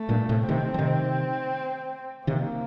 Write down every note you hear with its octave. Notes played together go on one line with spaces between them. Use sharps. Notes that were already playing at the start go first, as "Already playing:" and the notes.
Already playing: A3
G2 A#2
A2 C3
C3 D#3 C4
F3
C3 D#3
C3 D#3 A#3